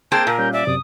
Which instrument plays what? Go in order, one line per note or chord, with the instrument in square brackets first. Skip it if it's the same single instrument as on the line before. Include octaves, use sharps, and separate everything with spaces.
[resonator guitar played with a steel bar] A#3 C4 G#4 [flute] A5 [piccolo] G6
[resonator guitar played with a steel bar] A#2 [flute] A#4 [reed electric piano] A5
[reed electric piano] G3 C#4 [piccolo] G6
[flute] D5 [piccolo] E5
[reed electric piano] F#2 C3 [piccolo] D#6